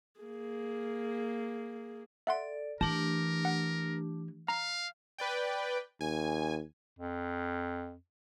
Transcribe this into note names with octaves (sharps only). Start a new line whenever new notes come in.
A#3 G#4
A4 D5 E5 F#5 C6
E3 A3 D4 G4 A#4 A5
F#5
F5 A#5
B4 D5 G5
D#2 G#5
F2